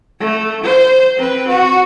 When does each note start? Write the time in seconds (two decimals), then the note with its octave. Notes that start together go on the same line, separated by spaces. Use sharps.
0.20 A3
0.64 C5
1.17 C4 B4
1.48 F#4